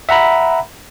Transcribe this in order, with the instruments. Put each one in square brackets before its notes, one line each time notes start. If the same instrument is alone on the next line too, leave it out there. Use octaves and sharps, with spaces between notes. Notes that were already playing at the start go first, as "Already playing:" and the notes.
[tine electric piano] E5 F#5 A#5 B5